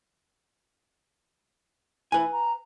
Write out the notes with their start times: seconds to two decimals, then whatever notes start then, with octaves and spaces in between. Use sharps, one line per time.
2.12 E4 B4 G#5
2.32 A#5